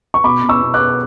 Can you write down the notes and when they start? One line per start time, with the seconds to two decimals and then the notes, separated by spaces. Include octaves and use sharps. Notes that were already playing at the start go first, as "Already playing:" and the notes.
0.14 C#6
0.24 B2 B5 D6
0.43 B2
0.49 C#6 E6
0.62 B2
0.74 D6 F#6
0.80 B2